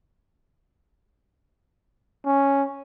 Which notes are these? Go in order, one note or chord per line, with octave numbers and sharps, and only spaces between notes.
C#4